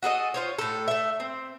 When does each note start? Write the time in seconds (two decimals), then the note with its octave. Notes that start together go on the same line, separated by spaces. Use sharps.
0.03 F#4 G#4 A4 D#5
0.34 F4 C5 C#5
0.59 A2 A4
0.88 A3 E5
1.20 C4